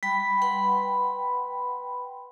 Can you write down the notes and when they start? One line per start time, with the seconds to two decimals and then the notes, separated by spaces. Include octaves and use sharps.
0.03 G3 G5 B5
0.42 B4 F#5 G5 B5 C6